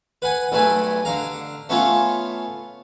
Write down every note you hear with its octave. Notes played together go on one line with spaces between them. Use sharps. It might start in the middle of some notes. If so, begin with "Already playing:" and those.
B4 F#5 G#5
B1 G3 A3 B4 G#5
D3 F5 A#5
A3 B3 C#4 F4